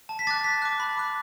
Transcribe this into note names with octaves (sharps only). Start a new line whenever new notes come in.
A5
B6
D6 F#6 A6
A5 B6
D6 F#6
B5
D6 F#6